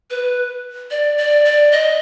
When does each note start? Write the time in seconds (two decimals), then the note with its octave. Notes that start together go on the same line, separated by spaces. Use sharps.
0.10 B4
0.91 D5
1.18 D5
1.45 D5
1.72 D#5